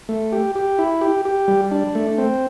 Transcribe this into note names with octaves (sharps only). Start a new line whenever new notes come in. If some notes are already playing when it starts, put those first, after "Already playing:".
A3
G4
G4
E4
G4
G4
G3
D4
A3
C4